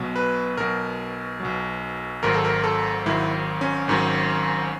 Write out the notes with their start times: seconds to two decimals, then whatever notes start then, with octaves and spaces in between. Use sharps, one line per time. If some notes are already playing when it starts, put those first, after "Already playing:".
Already playing: B1 B2 F#3
0.16 B4
0.57 B1 B2 F#3 A#4
1.40 B1 B2 F#3
2.22 G#1 G#2 D#3 F#3 A#4
2.34 A4
2.45 A#4
2.64 A4
3.06 G#1 G#2 D#3 F#3 E4
3.61 C#4
3.88 G#1 G#2 D#3 F#3